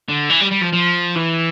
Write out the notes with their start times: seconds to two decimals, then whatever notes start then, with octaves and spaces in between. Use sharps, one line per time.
0.09 D3
0.30 E3
0.41 G3
0.52 G3
0.63 F3
0.73 F3
1.16 E3